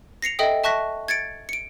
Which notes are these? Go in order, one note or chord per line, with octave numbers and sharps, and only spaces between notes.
A#6 C7 C#7 F7
A4 D#5 E5 G5 D#6
E5 A5 C#6 F#6 A#6 B6
G#6 A6 C#7 D7
C#7 D7